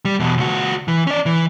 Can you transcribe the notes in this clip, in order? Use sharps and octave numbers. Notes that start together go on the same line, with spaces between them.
G3
E2 B2
C#2 F#4
E3
C#4 D5
E3